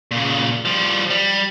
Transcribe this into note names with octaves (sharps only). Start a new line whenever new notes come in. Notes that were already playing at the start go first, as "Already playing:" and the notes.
A#2 C#3
F3 G3
G3